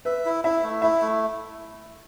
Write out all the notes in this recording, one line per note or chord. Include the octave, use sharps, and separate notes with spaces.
B4 E5
E4
E4 E5
A3
E4 E5
A3